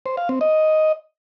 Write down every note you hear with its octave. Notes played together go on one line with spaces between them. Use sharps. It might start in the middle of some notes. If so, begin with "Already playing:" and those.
C5
F5
C4
D#5